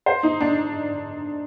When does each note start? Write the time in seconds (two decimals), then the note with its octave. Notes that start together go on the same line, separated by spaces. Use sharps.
0.06 C5
0.23 D#4
0.40 D4